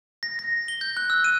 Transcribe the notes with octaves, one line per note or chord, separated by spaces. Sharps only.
A#6
A#6
G7
G6
F#6
E6
D#7